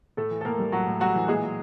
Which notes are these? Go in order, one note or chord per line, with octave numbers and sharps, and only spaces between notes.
A2 A3 A4
E3
A4
A2 A#3 A#4
G3
A2 F#3 F#4
A2
F#3 G3 F#4
E3
A#2 G#3 G#4
F#3